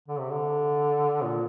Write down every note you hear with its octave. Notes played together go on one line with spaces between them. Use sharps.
D3
C3
D3
A#2